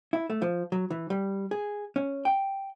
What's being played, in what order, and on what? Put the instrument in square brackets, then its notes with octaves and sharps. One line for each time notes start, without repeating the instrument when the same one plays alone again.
[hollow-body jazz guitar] E4
A3
F3
F#3
E3
G3
G#4
C#4
G5